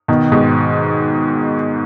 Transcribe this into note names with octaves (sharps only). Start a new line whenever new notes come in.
B2 D#3
G#2 B2